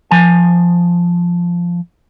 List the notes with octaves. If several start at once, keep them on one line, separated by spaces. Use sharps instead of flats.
F3 G#5